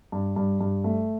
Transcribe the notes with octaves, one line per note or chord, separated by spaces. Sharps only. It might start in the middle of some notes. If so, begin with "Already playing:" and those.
G2
G2
G2
A3